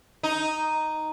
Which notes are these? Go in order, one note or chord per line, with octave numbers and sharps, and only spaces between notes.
D#4